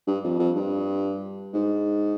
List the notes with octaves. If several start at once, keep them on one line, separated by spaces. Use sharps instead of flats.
G2
F2
F2
G2
G#2